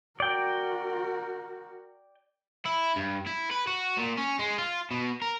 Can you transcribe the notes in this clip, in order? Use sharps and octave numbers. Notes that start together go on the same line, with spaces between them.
F#4 A#4 D5 G5
E4
G2
E4
B4
F#4
A#2
C#4
G#3
F4
B2
A#4